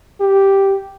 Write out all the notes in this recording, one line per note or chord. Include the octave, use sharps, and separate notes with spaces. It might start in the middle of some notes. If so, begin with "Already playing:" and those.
G4